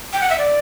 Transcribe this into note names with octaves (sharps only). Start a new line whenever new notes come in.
G5
F#5
E5
D5